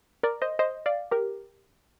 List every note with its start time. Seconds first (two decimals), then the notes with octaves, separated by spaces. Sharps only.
0.23 A#4 D5
0.42 C5 D#5
0.59 C5 D#5
0.86 D5 F5
1.11 G4 A#4